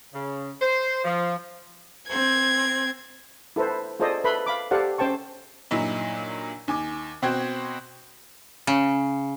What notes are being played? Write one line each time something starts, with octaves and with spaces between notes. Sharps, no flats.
C#3
C5
F3
C4 G#6
E4 A4 B4 C5
F4 G#4 A4 C5 D5 D#5
A4 B4 E5 B5 C6
F5 B5 D6
G4 A4 C5 D5 F5 F#5
C#4 C5 G5 A5 C#6
G2 A#2 F#3 D#4 E4
D#2 G#5 D6
B2 C4 F#4 C5 G5 G#6
C#3